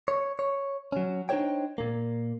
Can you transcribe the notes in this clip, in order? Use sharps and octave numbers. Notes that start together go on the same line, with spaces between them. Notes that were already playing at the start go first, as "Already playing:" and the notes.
C#5
C#5
F#3 C#4
D4 D#4 G#4 C5 C#5 G5
A#2 A#3